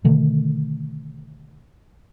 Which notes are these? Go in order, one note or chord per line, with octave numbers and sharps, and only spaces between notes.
B2 D3 D#3 A3